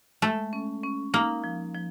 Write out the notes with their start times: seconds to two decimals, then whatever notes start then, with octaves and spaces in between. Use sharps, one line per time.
0.22 G#3 A3
0.53 C#4
0.83 C#4
1.14 A#3 D#4
1.44 F3
1.75 F3